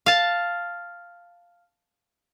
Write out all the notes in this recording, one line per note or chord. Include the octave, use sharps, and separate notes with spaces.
F5 A5